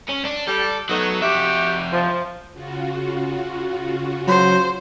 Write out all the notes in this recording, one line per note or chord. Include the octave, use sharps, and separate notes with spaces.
C#4
D4
G3 A4
F#3 A3 B3 D#4 F#4
F2 F#4 G4 E5
F3
C#3 F4 F#4
F#3 C5